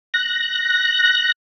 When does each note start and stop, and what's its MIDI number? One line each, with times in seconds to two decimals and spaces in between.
0.14 1.32 90
0.14 1.32 94